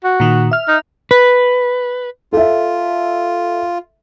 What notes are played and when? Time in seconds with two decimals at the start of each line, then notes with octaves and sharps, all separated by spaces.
0.04 F#4
0.20 A#2 D#3
0.51 E5 F6
0.68 D#4
1.11 B4
2.33 F4 A4 E5